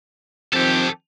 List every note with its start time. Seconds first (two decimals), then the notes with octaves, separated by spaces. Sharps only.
0.53 D#3 F3 C4 G4 A4